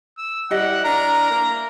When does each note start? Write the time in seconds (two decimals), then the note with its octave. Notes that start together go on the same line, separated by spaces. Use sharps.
0.18 E6
0.51 G3 E4 G4 D#5 F#5
0.85 D4 A#4 A#5
1.30 A#3